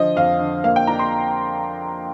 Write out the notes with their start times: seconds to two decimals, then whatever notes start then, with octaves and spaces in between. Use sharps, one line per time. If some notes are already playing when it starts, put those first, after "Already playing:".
Already playing: D3 F3 D#5
0.16 F2 F5
0.40 D3
0.64 A#3 F5
0.76 G5
0.87 D4 A#5
0.99 C6